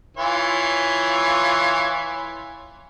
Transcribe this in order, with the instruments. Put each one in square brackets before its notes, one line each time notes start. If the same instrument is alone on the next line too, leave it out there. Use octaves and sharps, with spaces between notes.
[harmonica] E3 F4 C#5